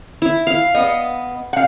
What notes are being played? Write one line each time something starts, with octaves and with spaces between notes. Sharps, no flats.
E4
F5
B3 D#5
F5 F#5